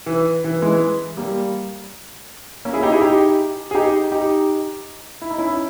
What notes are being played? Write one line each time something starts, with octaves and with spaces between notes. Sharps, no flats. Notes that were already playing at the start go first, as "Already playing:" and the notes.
E3
E3
E3 G#3
G3 A#3
A#3 C#4
E4 G#4
D#4 G4
E4 G#4
D#4 G4
G#4
D#4 G4
D#4 G4
E4
D#4
C#4 E4